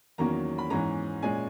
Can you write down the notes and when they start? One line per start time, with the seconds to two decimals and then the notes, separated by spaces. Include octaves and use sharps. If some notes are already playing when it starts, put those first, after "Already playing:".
0.18 E2 D#3 F#3 A#3 C#4 A#5
0.58 B5
0.70 G#2 E3 G#3 C#4 A#5
1.22 A#2 G#3 C#4 G#5